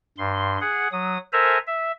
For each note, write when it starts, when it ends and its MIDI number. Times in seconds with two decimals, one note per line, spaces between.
0.18 0.58 43
0.18 0.58 84
0.61 0.88 68
0.61 0.88 78
0.92 1.18 54
0.92 1.18 87
1.33 1.58 69
1.33 1.58 70
1.33 1.58 72
1.33 1.58 76
1.33 1.58 80
1.33 1.58 82
1.67 1.92 76